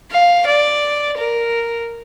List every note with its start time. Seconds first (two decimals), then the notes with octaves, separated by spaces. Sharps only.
0.11 F5
0.46 D5
1.18 A#4